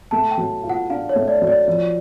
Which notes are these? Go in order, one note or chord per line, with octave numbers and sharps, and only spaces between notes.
A3 A5
G5
F#3
F4
F#5
D4 F5
C#5
A3
D5
F#3
D5
F3